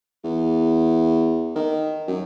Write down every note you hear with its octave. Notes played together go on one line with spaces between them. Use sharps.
E2
D#3
F#2